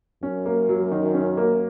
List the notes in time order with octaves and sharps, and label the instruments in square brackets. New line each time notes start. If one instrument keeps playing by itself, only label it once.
[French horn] F#2 [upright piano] C#4
[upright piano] A#3
F#3
D#3
C#4
A#3